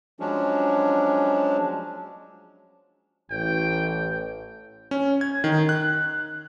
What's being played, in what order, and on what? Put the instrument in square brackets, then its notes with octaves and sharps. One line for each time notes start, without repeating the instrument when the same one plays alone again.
[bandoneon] F3 F#3 G#3 C#4 D4
[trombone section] A1 [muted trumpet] G5
[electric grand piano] C#4
G#6
D#3
F#6